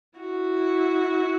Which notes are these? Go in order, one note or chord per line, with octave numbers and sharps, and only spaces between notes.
E4 F#4